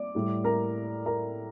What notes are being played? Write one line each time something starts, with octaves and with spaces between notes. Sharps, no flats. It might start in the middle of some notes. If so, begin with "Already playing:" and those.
Already playing: D5 D6
A2 G3
A#4 A#5
A#4 A#5